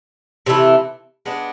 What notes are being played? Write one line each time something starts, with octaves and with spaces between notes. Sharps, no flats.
C3 E3 A3 E4
G#3 B3 D4